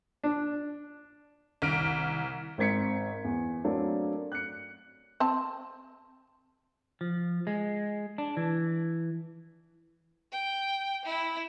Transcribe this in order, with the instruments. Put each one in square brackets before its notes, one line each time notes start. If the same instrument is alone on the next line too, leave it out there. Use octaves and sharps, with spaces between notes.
[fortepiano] D4
[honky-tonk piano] C2 F6 D7 [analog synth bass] D#3
[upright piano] G#1 C4 A#4 G#6 B6 C#7
E2
F#3 A3 A#3 C4 D4
F#6 C#7
[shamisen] C4 A5
[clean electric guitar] F3
G#3
D4
E3
[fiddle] G5
E4